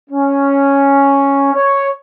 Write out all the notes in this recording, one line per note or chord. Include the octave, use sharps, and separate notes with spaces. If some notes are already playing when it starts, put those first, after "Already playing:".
C#4
C#5